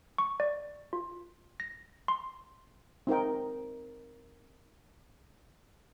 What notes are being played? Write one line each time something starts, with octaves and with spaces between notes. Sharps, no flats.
C#6
D5
F4
A#6
C6
C4 D#4 A#4 G5